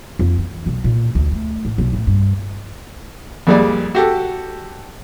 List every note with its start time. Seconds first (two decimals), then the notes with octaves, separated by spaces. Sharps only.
0.19 F2
0.38 E3
0.66 B1
0.84 A#2
1.15 D2
1.32 A3
1.65 A2
1.78 B1
1.93 A2
2.07 G2
3.47 F2 A#2 G3 G#3 D5
3.95 F#4 G4 A4